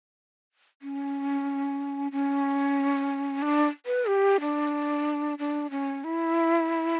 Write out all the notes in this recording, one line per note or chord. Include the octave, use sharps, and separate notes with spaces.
C#4
C#4
D4
B4
G4
D4
D4
C#4
E4